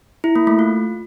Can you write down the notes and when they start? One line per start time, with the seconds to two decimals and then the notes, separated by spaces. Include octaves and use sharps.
0.24 E4
0.36 A#3
0.47 A3
0.59 F4